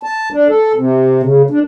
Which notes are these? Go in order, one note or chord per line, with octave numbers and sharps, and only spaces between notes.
A5
D4
A4
C3
C#3
D4